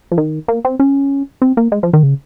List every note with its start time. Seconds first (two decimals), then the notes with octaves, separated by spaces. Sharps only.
0.12 F3
0.18 D#3
0.48 A#3
0.65 C4
0.79 C#4
1.42 C4
1.57 A#3
1.72 G#3
1.83 F3
1.93 D#3
2.03 C#3